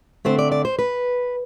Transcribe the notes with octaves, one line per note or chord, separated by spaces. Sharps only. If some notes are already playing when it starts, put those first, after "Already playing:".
D3 A3 C4 C5
D5
D5
C5
B4